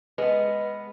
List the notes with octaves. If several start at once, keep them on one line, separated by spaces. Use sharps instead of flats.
G#3 B3 B4